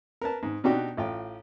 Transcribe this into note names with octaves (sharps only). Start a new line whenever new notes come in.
A#4 B4 A5
G#2
B2 D4 D#4 F#4 G4
A1 F4 G5